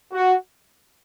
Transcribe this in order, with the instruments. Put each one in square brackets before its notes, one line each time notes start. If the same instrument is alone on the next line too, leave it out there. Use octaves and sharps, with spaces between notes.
[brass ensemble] F#4